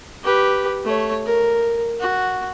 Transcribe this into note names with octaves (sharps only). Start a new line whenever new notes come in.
G4 B4
A3 C#5
A#4
F#4